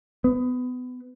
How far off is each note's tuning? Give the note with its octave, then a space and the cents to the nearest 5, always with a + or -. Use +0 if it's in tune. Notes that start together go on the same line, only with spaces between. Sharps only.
B3 +25